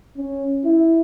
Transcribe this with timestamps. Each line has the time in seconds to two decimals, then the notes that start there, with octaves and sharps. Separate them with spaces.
0.17 C#4
0.65 E4